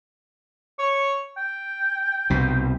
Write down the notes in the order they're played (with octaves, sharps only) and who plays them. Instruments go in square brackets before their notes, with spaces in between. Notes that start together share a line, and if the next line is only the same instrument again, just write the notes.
[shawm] C#5
G5
[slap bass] C2 B2